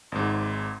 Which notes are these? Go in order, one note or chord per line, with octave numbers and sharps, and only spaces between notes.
G#1 G#2